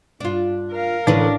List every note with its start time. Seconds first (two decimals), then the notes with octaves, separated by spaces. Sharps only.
0.20 G2 D4 F4
0.72 A#4 F5
1.07 A1 D3 D4 B4